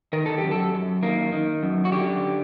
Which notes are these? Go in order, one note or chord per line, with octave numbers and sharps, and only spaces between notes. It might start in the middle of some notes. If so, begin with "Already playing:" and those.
D#3 A#4
A4
F#2 G4
A4
F#2
D#3 A#3
D#3
F#2
F#4
D3 G4